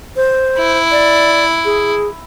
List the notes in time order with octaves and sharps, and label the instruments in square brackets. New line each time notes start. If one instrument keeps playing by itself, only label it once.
[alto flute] C5
[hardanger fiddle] E4
[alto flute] D5
G#4